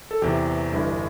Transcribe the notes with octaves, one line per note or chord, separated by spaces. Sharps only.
A4
E2 C3 E3 G4
G1 G2 E3